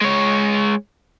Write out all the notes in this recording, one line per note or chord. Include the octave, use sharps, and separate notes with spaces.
G#3 C#5